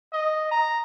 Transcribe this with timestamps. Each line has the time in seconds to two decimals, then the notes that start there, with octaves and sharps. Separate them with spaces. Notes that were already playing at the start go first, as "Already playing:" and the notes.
0.13 D#5
0.51 A#5